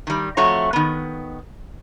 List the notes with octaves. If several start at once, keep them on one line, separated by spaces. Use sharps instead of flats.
D#3 G3
F2 A3 F#4 C#5 A#5
D#3 B3